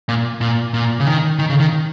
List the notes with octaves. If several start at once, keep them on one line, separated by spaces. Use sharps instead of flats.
A#2
A#2
A#2
C#3
D#3
D#3
C#3
D#3